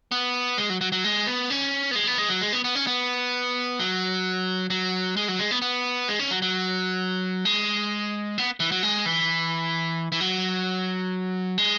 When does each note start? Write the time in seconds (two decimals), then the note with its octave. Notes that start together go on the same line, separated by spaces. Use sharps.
0.12 B3
0.58 G#3
0.70 F#3
0.81 F#3
0.92 F#3
1.04 G#3
1.27 B3
1.50 C#4
1.91 B3
1.95 G#3
2.07 B3
2.18 G#3
2.29 F#3
2.42 G#3
2.53 B3
2.64 B3
2.75 C#4
2.87 B3
3.79 F#3
4.70 F#3
5.17 G#3
5.28 F#3
5.39 G#3
5.51 B3
5.62 B3
6.08 G#3
6.19 C#4
6.31 F#3
6.42 F#3
7.45 G#3
8.38 B3
8.60 E3
8.72 F#3
8.83 G#3
9.06 E3
10.12 E3
10.20 F#3
11.58 G#3